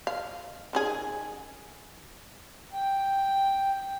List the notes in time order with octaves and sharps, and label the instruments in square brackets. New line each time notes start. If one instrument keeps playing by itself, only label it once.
[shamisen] F5
D#3 C#4 G#4
[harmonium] G5